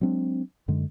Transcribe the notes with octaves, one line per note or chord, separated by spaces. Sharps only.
F#3 G#3 C4 D4
F#2 D3 G#3